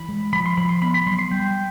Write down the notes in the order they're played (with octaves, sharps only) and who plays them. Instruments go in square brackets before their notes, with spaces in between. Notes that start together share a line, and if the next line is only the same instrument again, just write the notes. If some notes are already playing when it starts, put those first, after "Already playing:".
Already playing: [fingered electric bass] E3 [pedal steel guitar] B5
[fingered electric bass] G#3
[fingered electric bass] F3 [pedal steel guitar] B5
[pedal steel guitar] C6
[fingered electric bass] F3 [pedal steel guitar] B5
[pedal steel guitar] C6
[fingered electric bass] B3 [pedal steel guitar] B5
[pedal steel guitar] B5
[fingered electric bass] F#3 [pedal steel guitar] C6
[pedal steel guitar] C6
[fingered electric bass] G3 [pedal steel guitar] G5